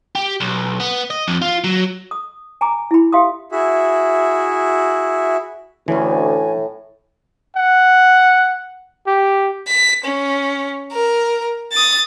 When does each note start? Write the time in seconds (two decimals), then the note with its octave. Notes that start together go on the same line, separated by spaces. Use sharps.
0.15 G4
0.41 B1
0.80 B3
1.10 D#5
1.28 F2
1.42 F4
1.64 F#3
2.11 D#6
2.61 G#5 A#5 B5 D6
2.91 E4 B5
3.13 G4 E5 F5 C6 D#6
3.52 E4 F#4 G#4 E5
5.88 D2 A2 E3 C#4 G#5
7.56 F#5
9.07 G4
9.68 B6
10.05 C#4
10.92 A#4
11.73 D#6 A6